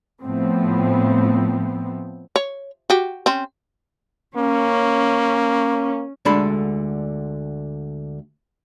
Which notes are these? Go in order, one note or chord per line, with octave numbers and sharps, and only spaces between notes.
A2 F3 B3 C4
C#5
F#4 G4
C4 C#4
A#3 C#4
D2 D3 G#3 D4 A4 B5